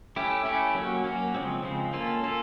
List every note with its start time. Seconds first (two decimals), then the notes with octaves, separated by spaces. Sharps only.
0.16 A3 C#4 E4 G4
0.45 A3 C#4 E4 G4
0.74 F#3 A#3 C#4 F#4
1.04 F#3 A#3 C#4 F#4
1.34 C#3 F3 G#3 C4
1.63 C#3 F3 G#3 C4
1.93 A#3 C#4 F4 A4
2.23 A#3 C#4 F4 A4